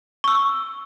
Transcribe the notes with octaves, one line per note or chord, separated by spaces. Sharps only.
C#6 E6